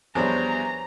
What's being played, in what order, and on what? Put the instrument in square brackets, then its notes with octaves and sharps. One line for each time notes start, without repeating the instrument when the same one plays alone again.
[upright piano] E2 [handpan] F3 C5 C#5 [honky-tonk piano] G3 D4 [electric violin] A#5